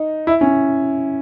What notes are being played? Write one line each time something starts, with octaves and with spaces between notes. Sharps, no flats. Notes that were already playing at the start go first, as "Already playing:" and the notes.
Already playing: D#4
E4
C#4